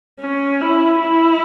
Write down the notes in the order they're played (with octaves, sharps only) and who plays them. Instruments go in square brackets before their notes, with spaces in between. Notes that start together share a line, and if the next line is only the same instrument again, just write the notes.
[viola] C#4
E4
E4